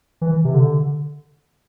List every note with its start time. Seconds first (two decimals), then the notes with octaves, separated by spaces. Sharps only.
0.21 E3
0.45 C3
0.55 D3